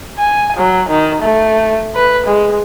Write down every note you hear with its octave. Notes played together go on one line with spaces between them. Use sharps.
G#5
F#3
D#3
A3
B4
G#3